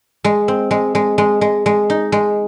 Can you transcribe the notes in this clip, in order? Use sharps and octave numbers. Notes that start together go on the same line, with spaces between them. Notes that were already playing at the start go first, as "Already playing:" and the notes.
G#3
C4
G#3
G#3
G#3
G#3
G#3
D#4
G#3